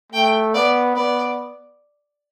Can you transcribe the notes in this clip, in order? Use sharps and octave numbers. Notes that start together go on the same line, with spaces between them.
A3 G5
B3 D5
B3 D5